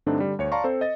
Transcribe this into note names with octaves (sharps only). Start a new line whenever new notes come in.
G2 D3 A3 C4 D4 D#4
D3 G3
D2 C#5 C#7
D5 F5 A5 A#5 C6 C#6
C4 A4 C5
D#5 A6